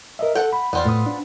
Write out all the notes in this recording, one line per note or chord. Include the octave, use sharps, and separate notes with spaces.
A#4 D#5 E5
A4 F#5 G5
B5
E2 B3 C4 F4 D5
A2 D#6
D4